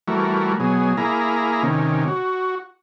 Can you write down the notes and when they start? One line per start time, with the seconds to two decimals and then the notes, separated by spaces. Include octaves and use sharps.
0.08 E3 G3 A3 F#4 A#4
0.60 B2 F#3 G#4
0.97 A#3 E4 G#4 A#5
1.63 C3 D#3 C#4
2.08 F#4